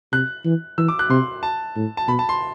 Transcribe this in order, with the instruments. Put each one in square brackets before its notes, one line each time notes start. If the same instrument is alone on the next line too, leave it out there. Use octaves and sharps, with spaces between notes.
[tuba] C3 [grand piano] F#6
[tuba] E3
[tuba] E3 [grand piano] E6
[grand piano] D6
F#6
[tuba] C3 [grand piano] C6
[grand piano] A5
[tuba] A2
[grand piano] A5
[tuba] B2 [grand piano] B5
[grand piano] A5
C6